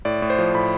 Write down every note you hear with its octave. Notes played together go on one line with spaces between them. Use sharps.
A2 D5
A2
C5
F3
A2 B5